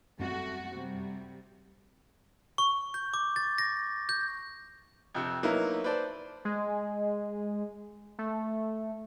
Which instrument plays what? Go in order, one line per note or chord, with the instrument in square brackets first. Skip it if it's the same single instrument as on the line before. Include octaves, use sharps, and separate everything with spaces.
[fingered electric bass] F#2 C4 [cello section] G3 A3 F#4
[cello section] C3 G3
[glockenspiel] C#6
G6
D6
A6
A#6
G6
[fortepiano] F2 C3
F#3 A#3 B3 D#4 E4
B4 C5 D5 A5
[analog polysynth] G#3
A3